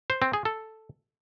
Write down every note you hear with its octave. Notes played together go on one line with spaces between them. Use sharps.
C5
C4
G#4
A4